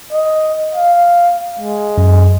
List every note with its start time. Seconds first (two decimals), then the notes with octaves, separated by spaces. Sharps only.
0.12 D#5
0.75 F5
1.59 G#3
1.98 F#2